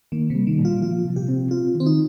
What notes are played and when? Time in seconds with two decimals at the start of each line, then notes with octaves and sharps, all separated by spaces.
0.12 D#3 A#3
0.30 C3 G3
0.47 D#3
0.59 A#2
0.65 F4
0.82 F3 F4
1.05 C3
1.16 G4
1.28 C4
1.51 C4 F4
1.75 D#3
1.80 C4
1.86 D#4